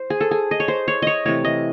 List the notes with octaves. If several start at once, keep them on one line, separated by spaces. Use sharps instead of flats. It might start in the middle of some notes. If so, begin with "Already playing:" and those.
Already playing: C5
G#4
A4
G#4
D#5
C#5
C5
C#5
C#5 D#5
C3 E3 A3 C#5
D#5